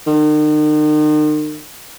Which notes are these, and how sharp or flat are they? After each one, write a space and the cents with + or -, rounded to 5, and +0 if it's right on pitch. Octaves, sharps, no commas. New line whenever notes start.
D#3 -40